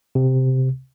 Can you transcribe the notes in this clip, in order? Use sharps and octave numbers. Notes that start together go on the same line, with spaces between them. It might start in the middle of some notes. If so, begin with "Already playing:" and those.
C3